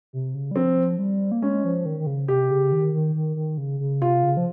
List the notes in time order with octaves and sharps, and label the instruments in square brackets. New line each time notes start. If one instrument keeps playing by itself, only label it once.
[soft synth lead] C3
C#3
G3
[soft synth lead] F3 [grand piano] C4
[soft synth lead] G3
A#3
[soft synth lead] G#3 [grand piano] C#4
[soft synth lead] F3
D#3
D#3
C#3
[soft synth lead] C3 [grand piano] G4
[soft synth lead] C#3
D#3
D#3
D#3
D#3
C#3
C#3
[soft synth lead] C3 [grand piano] F4
[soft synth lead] C#3
F3